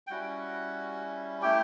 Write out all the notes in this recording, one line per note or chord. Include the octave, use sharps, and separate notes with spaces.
G5
G3 C#4 E4 F#4 F#5
A3 E4 G4 G5